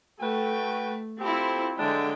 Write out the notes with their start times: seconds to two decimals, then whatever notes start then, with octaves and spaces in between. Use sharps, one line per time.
0.20 A3 F#4 B4 G5
1.20 C4 E4 F4 G4 A4
1.77 D3 F#3 G#3 D4 E4 G5